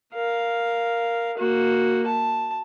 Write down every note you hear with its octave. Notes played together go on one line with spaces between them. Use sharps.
A#4 F5
A#3 F#4
A5